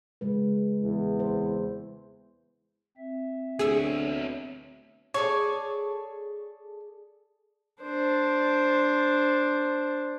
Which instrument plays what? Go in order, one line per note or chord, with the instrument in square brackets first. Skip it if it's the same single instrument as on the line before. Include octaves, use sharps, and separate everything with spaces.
[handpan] C#3 G#3 B4
[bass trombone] E2
[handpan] C5
[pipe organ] C4 E5
[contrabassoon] D2 [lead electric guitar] B3 C#5 [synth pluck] G#4 E6
[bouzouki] G#4 A4 D5 [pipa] C#5
[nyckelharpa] D4 C5